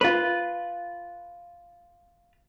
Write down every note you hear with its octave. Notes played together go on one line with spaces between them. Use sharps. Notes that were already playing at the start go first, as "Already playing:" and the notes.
F4 B4